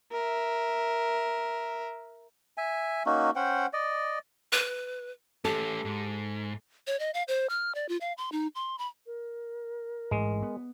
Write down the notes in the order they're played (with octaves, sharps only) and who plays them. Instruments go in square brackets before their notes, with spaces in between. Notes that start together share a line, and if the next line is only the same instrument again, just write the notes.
[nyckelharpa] A#4 E5
[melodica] E5 G#5
A#3 C#4 D#4 F#4
C#4 C5 F#5 G5
D5 D#5
[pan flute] B4
[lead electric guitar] A3 C#4 [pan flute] G4 [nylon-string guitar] A4
[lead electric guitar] G#2
[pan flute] C#5
D#5
F5
C5
F6
D5
F4
F5
C6
D#4
C6
B5
[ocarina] A#4
[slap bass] A1 G#2 [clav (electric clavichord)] G#3
[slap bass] B3